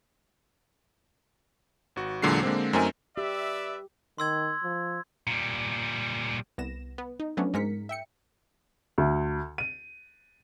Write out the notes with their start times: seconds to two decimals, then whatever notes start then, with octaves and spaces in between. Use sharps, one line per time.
1.96 G#1 F#4
2.22 E2 A#2 D3 F#3 G#3 C7
2.43 D3 G#3 A#3 C4
2.73 F#2 A3 C4 D#4 A#4 G#5
3.17 G4 B4 D5 E5
4.18 D#3 C6 E6 G#6
4.63 F3
5.27 A#2 G3
6.58 C2 B3 A#6 E7
6.98 B3
7.20 D#4
7.37 F3 F#3 A3 B3 C#4 D4
7.54 G#2 G#3 A#4 B6 C#7
7.89 E5 G5 C#7
8.98 D2
9.58 D#7